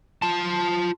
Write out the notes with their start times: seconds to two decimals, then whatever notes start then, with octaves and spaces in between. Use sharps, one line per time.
0.22 F4 A5